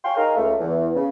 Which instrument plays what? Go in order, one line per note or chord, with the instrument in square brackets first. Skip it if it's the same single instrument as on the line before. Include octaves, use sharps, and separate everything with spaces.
[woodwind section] C#5 F5 G5 G#5 C6
D#4 G#4 A#4 F5
C#2 A3
E2
C#3